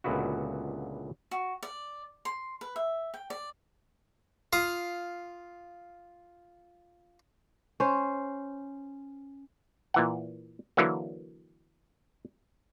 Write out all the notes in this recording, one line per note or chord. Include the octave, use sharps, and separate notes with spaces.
C#2 A#2 D3 B3 E4 F#4
F#4
D5
C6
B4
E5
G5
D5
F4 F5 D#6
C#4 C5
A#2 E3 F#5
D3 E3 F#3 A#3